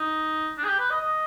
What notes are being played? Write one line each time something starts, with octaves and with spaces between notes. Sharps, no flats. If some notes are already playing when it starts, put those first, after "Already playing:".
Already playing: D#4
D4
G#4
G4
B4
D#5
D#5